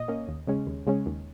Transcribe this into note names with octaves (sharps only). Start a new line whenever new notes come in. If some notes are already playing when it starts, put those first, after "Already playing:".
Already playing: A#2 D#5
A#3 C#4
D#2
C#3 G#3 C#4
D#2
C#3 G#3 C#4
D#2